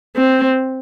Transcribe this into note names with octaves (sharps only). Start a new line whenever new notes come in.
C4